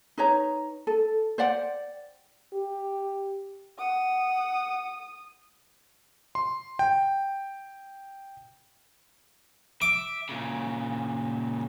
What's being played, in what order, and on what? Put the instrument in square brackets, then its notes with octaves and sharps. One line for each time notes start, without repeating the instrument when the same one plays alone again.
[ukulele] D#4 B4 C#5 A#5
A4
C5 D5 F#5 G5
[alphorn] G4
[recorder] F#5 [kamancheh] D#6
[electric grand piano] C6
G5
[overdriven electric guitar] E5 [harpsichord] D6
[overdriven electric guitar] A#2 C#3